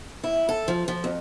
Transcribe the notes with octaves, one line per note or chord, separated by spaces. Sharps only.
E4
A4
F3
F3
F2